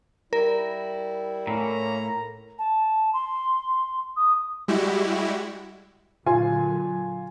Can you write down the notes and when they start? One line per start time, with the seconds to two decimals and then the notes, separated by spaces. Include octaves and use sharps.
0.33 G3 E4 A#4
1.47 A2 A#3 C#4 A#5
2.58 A5
3.13 C6
4.16 D#6
4.68 G3 G#3 E4 F#4 G4
6.26 A#2 D3 F#3 F4 G#5 C6